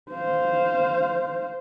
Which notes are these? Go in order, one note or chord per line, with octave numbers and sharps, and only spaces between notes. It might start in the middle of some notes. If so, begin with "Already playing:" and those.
C5 F5